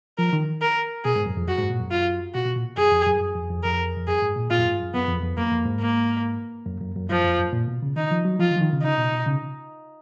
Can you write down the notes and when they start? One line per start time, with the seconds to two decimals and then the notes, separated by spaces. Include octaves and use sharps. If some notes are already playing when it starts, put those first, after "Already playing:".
0.18 F3 A#4
0.33 D#3
0.61 A#4
1.05 B2 G#4
1.16 G#2
1.26 F#2
1.37 F2
1.48 F#2 F#4
1.59 G#2
1.70 A#2
1.80 F#2
1.91 F4
2.34 B2 F#4
2.45 B2
2.56 A#2
2.78 F#2 G#4
2.92 F2
3.06 F#2
3.21 F#2
3.36 F2
3.50 F2
3.64 F2 A#4
3.97 F2
4.07 F#2 G#4
4.22 G#2
4.36 A#2
4.50 A#2 F4
4.58 F#2
4.65 G#2
4.79 F#2
4.94 F#2 B3
5.08 F2
5.16 F#2
5.23 F2
5.37 F#2 A#3
5.51 F2
5.66 G#2
5.80 A#3
6.66 F#2
6.81 F#2
6.96 F#2
7.10 F#2 F3
7.25 F2
7.39 F#2
7.53 A#2
7.68 B2
7.82 C#3
7.96 D#3 D#4
8.11 F3
8.25 F#3
8.39 F3 F4
8.51 D#3
8.57 F3
8.61 D#3
8.72 C#3
8.83 C#3 D#4
8.97 B2
9.12 B2
9.26 C#3